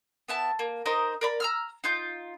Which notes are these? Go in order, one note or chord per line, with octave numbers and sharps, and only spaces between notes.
B3 E4 A5
A#3
D#4 A#4 C5 D#5
A#4 D5 B5
A#5 E6 F6
D#4 F4 G6